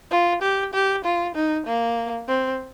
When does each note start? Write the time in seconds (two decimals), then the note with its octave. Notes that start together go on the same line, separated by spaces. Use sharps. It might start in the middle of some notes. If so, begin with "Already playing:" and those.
0.11 F4
0.42 G4
0.74 G4
1.05 F4
1.35 D#4
1.66 A#3
2.28 C4